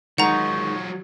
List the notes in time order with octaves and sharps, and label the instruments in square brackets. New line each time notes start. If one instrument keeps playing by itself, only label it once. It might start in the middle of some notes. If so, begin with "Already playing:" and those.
[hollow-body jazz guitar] D#3 G#3 D#4 [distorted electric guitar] F#3 F4 [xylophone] F#5 A#5 [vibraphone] C#6